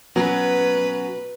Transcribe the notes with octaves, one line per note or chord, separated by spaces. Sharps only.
F#3 B3 C#4 B4